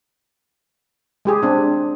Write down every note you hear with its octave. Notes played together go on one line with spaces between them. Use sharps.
G#3 G4 G#4
C4 D4